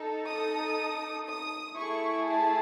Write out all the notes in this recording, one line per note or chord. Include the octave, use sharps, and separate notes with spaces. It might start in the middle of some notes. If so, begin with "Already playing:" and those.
Already playing: D#4 A4
D#6
D#6
A3 E4 G#4 C#6
A5